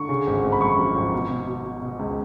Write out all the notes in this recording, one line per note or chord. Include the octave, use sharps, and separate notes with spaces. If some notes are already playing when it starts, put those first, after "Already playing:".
Already playing: D3 C#6
C#3
G#1
G#1
B5
F#2 C#6
F3
G#1
B2
B2
B2
B2
B2
C#2